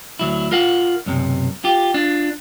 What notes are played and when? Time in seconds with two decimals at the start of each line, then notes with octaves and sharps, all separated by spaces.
0.19 D2 F#3 E4
0.52 F4 A#4 F5 F#5
1.06 B1 F#2 C3
1.64 F4 G4
1.94 D4 F4